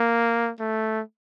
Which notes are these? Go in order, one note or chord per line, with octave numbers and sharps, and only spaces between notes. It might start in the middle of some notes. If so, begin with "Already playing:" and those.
Already playing: A#3
A3